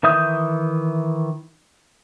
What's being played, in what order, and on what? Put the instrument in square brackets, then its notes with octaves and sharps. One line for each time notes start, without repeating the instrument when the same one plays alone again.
[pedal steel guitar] D#3 E3 E5 D#6 G6